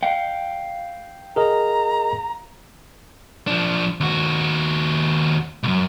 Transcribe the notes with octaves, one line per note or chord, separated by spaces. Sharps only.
F5 G5
G#4 A#4 D#5 A#5
F3 D4
D#2 F#4
C2 F#2